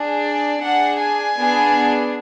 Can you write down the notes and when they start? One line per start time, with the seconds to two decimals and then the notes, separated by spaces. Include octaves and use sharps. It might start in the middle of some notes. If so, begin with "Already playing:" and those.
Already playing: D4 G#4
0.27 D5
0.63 D4 G#4 F#5
1.01 G#5
1.38 B3 D4 G#4